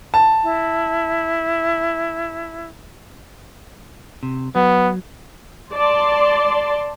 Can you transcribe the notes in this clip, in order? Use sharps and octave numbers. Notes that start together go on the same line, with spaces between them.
A5
E4
C3
F#3 B3
D5 A5 C6